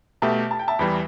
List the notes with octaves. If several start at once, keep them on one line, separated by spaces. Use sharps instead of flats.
B2 A3 G4 E5 A5
A5
G5
E5 A5
E2 E3 G3 E4 G5 B5